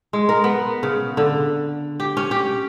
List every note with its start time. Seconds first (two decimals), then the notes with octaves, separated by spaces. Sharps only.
0.13 G#3
0.29 A#4
0.44 B3
0.83 C#3
1.17 D3
2.00 G4
2.17 C#4
2.31 G4